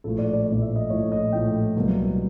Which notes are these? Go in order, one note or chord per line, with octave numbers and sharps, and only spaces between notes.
A#1 A2 F3 A3 A4
D5
D5
A#1 A2 F3 A3 D5
E5
D#5
A#1 A2 F3 A3 C#5
D#5
A#1 A2 F3 A3 G5
C2 B2 F#3 A#3